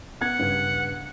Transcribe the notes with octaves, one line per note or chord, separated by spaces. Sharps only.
B3 F#5 G#6
G2 C#3